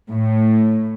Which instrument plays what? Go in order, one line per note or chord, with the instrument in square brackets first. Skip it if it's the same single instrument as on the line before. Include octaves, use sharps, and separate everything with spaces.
[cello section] A2